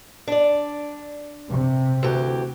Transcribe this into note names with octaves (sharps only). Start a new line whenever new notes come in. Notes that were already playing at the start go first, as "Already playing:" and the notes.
D4 D5
C3
D2 E3 G4